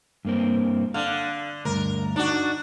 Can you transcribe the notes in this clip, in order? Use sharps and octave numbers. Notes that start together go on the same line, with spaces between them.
G2 A#3 C4
D3 F5
D2 G2 A#4
D4 D#4 F#4